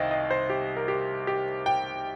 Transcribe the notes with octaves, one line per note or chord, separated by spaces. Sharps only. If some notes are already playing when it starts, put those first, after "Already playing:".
Already playing: C2 D#3 C5 D#5 F5 G5
D#5
C5
G4
A#4
G4
G4
G5